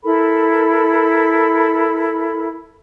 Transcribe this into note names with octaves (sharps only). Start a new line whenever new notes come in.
E4 A4 A#4 B5